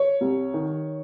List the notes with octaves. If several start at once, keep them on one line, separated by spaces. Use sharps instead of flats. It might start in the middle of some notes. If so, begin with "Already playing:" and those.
Already playing: C#5
C2
D#3